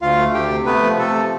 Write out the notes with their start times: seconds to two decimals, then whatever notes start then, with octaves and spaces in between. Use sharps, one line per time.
0.01 D2 F4 F5
0.18 A3
0.34 D2 G4 G5
0.50 C3
0.66 A3 B3 B4
0.83 F3
0.98 C3 A3 A4
1.15 F3